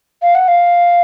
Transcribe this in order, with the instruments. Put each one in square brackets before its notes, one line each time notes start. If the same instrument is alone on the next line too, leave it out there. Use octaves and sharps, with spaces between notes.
[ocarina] F5
F#5
F5